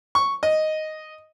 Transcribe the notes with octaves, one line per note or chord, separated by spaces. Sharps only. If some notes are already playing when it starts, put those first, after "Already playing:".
C#6
D#5